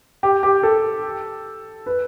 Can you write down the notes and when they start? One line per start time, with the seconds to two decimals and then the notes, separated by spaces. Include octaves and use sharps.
0.23 G4
0.43 G4
0.63 A4
1.86 B4